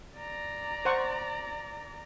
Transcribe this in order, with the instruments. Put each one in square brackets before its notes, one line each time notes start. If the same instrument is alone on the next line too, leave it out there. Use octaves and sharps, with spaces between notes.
[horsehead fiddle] D5 A#5
[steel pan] C5 F#5 C#6